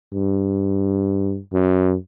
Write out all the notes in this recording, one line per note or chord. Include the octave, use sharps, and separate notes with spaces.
G2
F#2